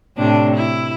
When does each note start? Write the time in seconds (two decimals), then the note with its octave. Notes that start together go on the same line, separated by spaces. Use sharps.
0.17 A2 C3 D4
0.56 E4